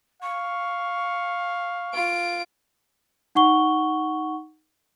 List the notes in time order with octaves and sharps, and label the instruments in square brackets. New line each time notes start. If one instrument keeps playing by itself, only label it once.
[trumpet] F5 [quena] C#6
[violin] F4 D7
[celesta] D#4 F#5 C#6 G7